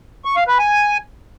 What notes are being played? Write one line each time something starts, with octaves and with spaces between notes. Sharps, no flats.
C#6
F5
B4
G#5